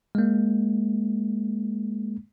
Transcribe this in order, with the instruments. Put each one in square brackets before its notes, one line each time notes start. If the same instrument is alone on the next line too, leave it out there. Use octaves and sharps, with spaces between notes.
[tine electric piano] G#3 A#3